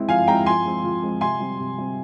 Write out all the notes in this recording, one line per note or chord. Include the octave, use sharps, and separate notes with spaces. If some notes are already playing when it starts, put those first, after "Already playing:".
Already playing: G#3 C4 E4
F3 F5 G#5
G#3 C4 E4 G5 A#5
F3 G#5 C6
G#3 C4
F3
G#3 C4
C3 G#5 C6
G3 C4
C3
G3 C4